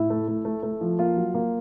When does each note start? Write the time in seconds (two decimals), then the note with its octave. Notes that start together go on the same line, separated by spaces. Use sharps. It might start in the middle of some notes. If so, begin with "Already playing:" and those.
Already playing: A2 E4 E5
0.10 A3
0.28 A3
0.45 A3
0.63 A3
0.81 F3
0.99 A#3 F4 F5
1.17 F#3
1.34 A#3